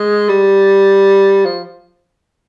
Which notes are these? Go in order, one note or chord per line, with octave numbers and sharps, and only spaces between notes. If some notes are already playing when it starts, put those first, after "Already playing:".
Already playing: G#3
G3
F3